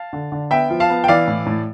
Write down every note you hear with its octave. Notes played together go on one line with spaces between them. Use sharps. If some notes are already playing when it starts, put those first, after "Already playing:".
Already playing: F5 A5
D3
D3
B3 E5 G5
F3
F5 A5
B3
G5
E3 D5 F5
A2
A2